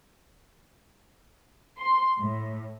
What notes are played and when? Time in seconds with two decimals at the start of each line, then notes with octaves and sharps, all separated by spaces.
1.78 C6
2.19 A2